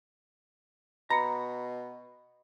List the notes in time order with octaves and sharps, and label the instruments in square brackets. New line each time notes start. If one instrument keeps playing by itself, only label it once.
[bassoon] B2 [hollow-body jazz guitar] A#5 [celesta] B5 C#7